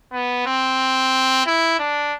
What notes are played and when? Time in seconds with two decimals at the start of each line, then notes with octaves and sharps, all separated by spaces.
0.13 B3
0.47 C4
1.46 E4
1.79 D4